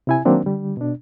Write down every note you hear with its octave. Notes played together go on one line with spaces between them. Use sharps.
C3 E4 G#5
D#3 F#3 A#3 C4 D4
D3 G3
B2 D4